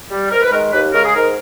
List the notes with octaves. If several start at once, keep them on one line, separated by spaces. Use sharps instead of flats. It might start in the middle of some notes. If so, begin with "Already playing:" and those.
G3
G#2 A#4
B4
D#3 G#3 A#4
D#2 B4
C#3 G#3 A#4
G#4
G#2 A#4